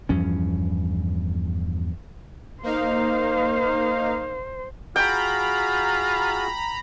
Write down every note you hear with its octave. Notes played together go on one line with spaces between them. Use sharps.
E2 G2 F3 C#4
A#3 D#4 C5 F5
F4 F#4 G#4 G5 A#5 B5